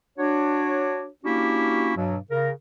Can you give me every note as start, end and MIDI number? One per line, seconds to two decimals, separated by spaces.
0.18 1.07 62
0.18 1.07 66
0.18 1.07 73
1.24 1.92 58
1.24 1.92 61
1.24 1.92 62
1.24 1.92 64
1.24 1.92 66
1.24 1.92 67
1.96 2.17 43
1.96 2.17 47
1.96 2.17 54
2.31 2.51 49
2.31 2.51 70